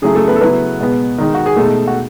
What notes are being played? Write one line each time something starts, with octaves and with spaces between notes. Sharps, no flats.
C#3 F#3 A3 E4 G#4
A3 A4
B3 B4
A4
C#3 F#3 B3 E4 B4
B2 G#3 B3
D#3 G#3 D#4
F#4
G#4
B2 G#3 A3 D#4 A4
F#4